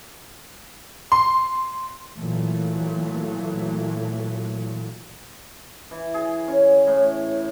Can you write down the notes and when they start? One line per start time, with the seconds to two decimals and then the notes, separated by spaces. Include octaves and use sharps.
1.12 C6
2.16 A#2 E3 F#3 A3
5.91 E3
6.14 G#4
6.48 C#4
6.87 A2